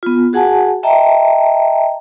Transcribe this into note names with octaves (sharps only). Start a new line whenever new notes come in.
B3 F4
F#4 G#4 F#5 G#5 A5
D#5 E5 G5 A5 A#5